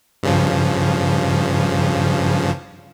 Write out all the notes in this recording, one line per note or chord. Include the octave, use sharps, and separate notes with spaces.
G2 C#3 F3